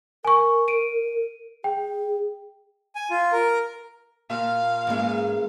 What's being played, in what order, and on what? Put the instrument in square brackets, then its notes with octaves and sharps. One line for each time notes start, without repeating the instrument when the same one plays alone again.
[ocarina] A#4 [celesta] G#5 C#6
[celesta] D7 D#7
[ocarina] G#4 [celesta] G5
[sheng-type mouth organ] G#5
F4
A#4
[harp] A#2 F4 [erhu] F5
[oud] G#2 G#3 [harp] E3 A#3 C#4